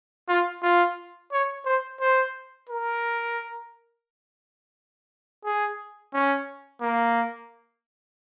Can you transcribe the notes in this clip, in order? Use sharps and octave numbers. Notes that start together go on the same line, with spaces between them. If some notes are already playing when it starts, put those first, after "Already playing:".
F4
F4
C#5
C5
C5
A#4
G#4
C#4
A#3